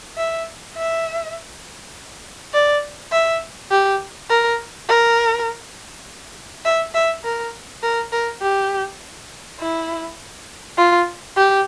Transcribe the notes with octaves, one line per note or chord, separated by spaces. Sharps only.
E5
E5
D5
E5
G4
A#4
A#4
E5
E5
A#4
A#4
A#4
G4
E4
F4
G4